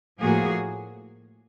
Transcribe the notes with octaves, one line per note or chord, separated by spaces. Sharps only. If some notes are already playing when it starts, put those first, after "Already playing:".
A2 F3 A#3 F#4 G#4